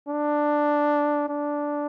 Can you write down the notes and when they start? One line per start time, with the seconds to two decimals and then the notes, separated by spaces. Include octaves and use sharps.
0.08 D4
1.29 D4